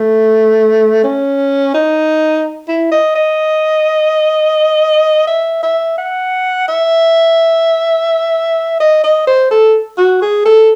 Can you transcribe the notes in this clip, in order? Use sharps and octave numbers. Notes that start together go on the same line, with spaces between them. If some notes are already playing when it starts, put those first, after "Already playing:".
Already playing: A3
C#4
D#4
E4
D#5
D#5
E5
E5
F#5
E5
D#5
D#5
C5
A4
F#4
G#4
A4